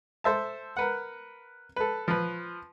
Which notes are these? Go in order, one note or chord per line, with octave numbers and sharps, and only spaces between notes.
A4 C5 E5 A5
A#4 B4 F#5
A4 B4
F3 B4